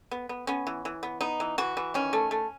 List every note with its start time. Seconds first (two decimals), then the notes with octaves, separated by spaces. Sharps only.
0.11 B3
0.29 B3
0.47 B3 C#4
0.67 E3
0.85 E3
1.03 B3
1.21 B3 D#4
1.40 E3
1.58 E3 F#4
1.77 E3
1.94 D#3 C#4
2.13 A3
2.31 A3